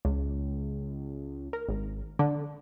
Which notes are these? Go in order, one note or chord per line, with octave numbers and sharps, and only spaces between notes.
C#2
A#4
G#1
D3